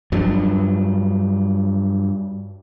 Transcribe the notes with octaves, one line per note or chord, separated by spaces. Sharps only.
G2 F3 F#3